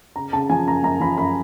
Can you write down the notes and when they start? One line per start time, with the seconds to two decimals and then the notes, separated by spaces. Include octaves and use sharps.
0.16 C#3 A#5
0.33 C#3 A5
0.50 F3 G#5
0.67 F#2 A#5
0.83 F#2 A#5
1.00 F3 B5
1.18 F#2 B5